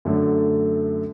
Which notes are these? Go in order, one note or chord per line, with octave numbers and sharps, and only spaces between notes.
F#2 D3 A3